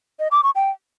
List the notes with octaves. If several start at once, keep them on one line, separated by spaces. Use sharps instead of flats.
D#5
D6
C#6
G5